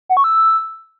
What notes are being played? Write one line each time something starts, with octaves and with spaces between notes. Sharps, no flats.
F#5
C#6
E6